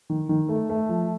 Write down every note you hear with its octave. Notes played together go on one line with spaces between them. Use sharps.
D#3
D#3
A3
A3
F3